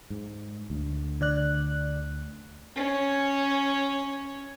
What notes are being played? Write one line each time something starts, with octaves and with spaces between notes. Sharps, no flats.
G#2
D2
D3 D5 F#6
C#4 C#5